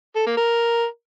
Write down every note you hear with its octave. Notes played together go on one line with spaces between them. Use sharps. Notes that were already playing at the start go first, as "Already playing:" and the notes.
A4
A#3
A#4